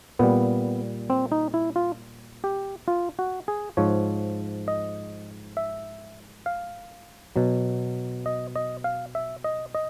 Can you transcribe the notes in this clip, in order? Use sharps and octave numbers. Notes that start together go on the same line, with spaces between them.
A#2 G3 B3
C4
D#4
E4
F4
G4
F4
F#4
G#4
G#2 F3 C#5
D#5
E5
F5
B2 F#3
D#5
D#5
F5
E5
D#5
D#5